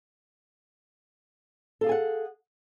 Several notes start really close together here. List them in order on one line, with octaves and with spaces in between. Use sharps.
A4 F5 G#4 G#5 F#5